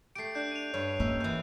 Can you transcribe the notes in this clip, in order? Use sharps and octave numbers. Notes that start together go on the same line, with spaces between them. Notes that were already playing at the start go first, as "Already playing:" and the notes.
A3 G4 C7 D7
D4 G6
D#7 F7
G2 C#5
A#3 C#4 D#4 E5
F#2 E3 G6